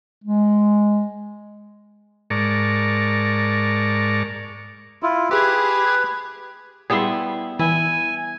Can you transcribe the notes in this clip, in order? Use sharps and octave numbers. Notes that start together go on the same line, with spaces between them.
G#3
G#2 A#4 D5 A5 C#6
E4 F4
G4 G#4 B4 G#6
G3 B3 E4 G#4 C6
E3 E4 G#5